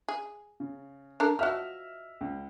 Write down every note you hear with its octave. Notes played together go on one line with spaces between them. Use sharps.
G#4
C#3
D4 A4 A#4
F3 F#4 D#5 E5 F6
C#2